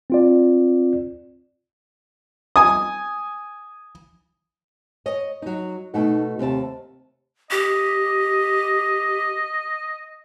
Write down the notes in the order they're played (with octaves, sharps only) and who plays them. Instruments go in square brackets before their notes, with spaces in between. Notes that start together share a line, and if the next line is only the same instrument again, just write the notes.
[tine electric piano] C4 F4 D5
[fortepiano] G#5 D#6
[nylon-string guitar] C#5 D#5
F#3 D#4
[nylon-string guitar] B2 A3 F#5 [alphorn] D#4
[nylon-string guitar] D#2 A5 [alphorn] C3
[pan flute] G4 [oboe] D#5